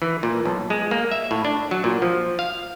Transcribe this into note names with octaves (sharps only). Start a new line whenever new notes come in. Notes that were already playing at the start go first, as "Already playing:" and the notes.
E3
A#2
B1
G#3
A#3
E5
A2
D4
F#3
A#2
F3
F5